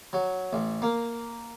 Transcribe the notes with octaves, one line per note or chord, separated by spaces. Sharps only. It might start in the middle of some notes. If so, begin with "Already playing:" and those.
F#3
A1
A#3